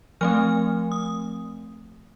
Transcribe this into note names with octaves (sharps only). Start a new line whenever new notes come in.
F3 A3 C4 F6
D#6